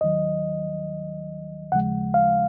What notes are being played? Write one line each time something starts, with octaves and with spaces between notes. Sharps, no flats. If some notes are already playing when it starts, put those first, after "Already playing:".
D#2 D#3 F#3 D#5
D#2 C#3 F3 G#3 F#5
F5